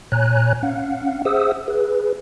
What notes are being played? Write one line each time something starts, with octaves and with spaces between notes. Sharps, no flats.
A#2 C#5 G#5 A#5 F#6
C#4 F5 F#5
G#4 C5 E5 F#5 D#6 E6
G#4 B4